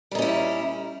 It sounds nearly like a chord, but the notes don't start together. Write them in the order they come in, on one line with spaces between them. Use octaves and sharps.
G3 D#4 C#4 E4